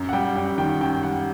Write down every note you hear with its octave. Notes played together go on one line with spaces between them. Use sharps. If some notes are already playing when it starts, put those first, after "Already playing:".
Already playing: F#2
F#5
G3 G5
F#2 G5
D#3 G5
F#2 G5
G3 F#5